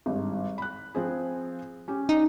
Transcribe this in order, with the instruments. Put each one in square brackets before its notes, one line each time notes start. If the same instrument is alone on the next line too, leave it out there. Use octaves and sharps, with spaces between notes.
[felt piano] G#1 G2
B5 F#6
F3 C4 G#4
C#4 G4
[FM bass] D#4